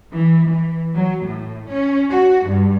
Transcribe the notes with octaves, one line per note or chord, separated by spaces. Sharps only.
E3
E3
F#3
A2
C#4
F#4
G2